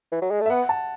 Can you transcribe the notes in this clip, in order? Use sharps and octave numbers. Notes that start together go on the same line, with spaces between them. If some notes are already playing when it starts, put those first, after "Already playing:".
E3
F#3
G#3
A3
E5
B3 F#5
A5